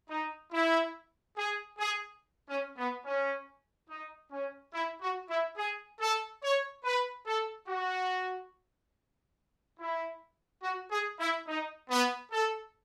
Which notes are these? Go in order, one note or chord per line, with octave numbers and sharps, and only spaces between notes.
D#4
E4
G#4
G#4
C#4
B3
C#4
D#4
C#4
E4
F#4
E4
G#4
A4
C#5
B4
A4
F#4
E4
F#4
G#4
E4
D#4
B3
A4